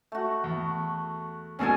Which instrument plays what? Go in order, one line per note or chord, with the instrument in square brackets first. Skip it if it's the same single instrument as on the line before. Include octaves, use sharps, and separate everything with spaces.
[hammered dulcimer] A3 F#4
[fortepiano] E2
[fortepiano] D#2 B2 G#3 [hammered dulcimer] C#4 A4 G#5